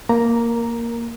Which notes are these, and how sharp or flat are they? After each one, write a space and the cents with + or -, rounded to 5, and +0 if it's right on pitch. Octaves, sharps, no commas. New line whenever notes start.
A#3 +0 A#4 +0 A#5 +0